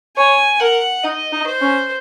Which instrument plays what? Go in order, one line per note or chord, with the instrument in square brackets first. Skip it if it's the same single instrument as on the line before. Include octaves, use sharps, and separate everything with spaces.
[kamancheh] C#5 [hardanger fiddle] G#5
[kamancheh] A#4 [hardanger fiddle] F#5
[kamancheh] D#4 [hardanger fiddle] D#5
[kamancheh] D#4
[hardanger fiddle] C5
[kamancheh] C#4